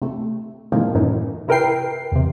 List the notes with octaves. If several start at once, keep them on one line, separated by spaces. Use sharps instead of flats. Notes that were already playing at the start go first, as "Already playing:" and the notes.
C3 A3
A2 C3 D#3 F3 G#3 A#3
F#2 A2 D#3 E3
C3 E4 A#4 B4 G5 C7
E2 C3